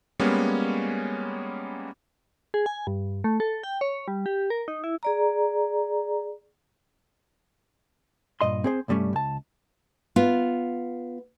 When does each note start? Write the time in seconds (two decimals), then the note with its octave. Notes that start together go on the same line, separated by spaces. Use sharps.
0.20 G3 G#3 A#3 B3 C#4
2.54 G#4
2.66 G#5
2.87 G2
3.24 A3
3.40 A4
3.63 G5
3.81 C#5
4.08 G3
4.26 G4
4.50 A#4
4.68 D#4
4.84 E4
5.03 G#4 D5 A#5
8.41 G2 A#2 D#5 C6
8.64 C4 G#4 C5
8.88 C2 G2 G3 A3 C#4
9.13 C#2 A5
10.16 B3 F4